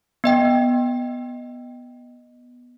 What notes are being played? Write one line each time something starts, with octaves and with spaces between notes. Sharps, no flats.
B3 D#5 G5